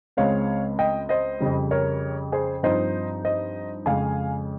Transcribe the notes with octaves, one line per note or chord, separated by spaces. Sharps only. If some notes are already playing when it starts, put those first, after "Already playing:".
C#2 C#3 G#3 C4 C#5 F5
D#5 G5
C5 D#5
F2 C#3 G3
A#4 C#5
G#4 C5
G2 F3 C4 D#4 C5 D#5
C5 D#5
F2 C#3 G#3 F5 G#5